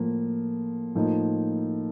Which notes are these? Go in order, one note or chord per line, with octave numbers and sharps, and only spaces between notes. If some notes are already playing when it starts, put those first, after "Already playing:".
Already playing: A2 F3 A#3
A2 F3 A#3 D#4